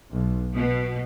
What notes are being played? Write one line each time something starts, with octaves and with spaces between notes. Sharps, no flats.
B1
B2